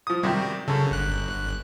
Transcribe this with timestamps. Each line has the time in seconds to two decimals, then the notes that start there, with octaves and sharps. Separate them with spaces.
0.07 F3 D#6
0.23 F#2 C3 D#3 G3
0.68 F#2 C#3 A4
0.91 G1 F#6